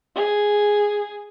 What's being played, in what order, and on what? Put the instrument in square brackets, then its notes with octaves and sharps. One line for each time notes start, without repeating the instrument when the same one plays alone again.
[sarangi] G#4